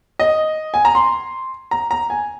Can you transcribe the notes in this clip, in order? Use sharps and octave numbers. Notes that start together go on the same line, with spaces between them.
D#5
G#5
A#5
C6
A#5
A#5
G#5